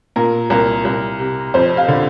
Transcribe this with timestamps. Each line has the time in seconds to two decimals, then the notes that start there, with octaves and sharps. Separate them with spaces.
0.16 A#2 A#4
0.50 C2 A#4
0.85 C2
1.19 C3
1.54 F2 C5
1.77 F5
1.88 D3